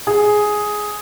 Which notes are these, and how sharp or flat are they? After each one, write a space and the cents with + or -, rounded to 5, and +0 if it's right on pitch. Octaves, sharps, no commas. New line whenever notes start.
G#4 +5